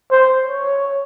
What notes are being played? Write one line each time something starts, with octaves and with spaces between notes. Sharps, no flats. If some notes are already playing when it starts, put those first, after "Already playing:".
C5
C#5